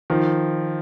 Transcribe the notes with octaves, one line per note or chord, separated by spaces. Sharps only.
D#3 F3